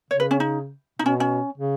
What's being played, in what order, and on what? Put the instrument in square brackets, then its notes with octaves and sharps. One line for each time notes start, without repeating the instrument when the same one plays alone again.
[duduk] C#3 [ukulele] C#5
[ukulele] B4
C#4
D#4
[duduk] B2 [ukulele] D#4
[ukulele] C#4
C#4
[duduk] C#3